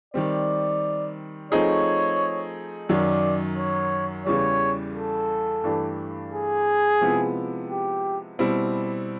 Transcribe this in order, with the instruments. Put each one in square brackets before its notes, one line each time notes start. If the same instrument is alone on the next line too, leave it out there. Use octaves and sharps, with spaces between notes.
[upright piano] D#3 G3 C4 [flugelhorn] D5
[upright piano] F3 A3 C4 D#4 G#4 [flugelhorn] C#5
[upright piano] F#2 D#3 F#3 [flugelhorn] D5
[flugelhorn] C#5
[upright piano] E2 C#3 E3 G3 [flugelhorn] C#5
[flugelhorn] A4
[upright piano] G2 E3 A3 D4 G4
[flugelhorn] G#4
[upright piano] C3 F3 G#3 B3 E4
[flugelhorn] G4
[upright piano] B2 G3 C4 E4